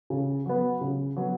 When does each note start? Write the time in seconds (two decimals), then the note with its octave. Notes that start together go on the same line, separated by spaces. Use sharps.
0.10 C#3
0.46 F#3 B3
0.81 C#3
1.16 F#3 B3